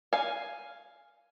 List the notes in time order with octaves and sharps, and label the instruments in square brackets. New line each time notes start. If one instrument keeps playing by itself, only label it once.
[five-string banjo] F5 G#5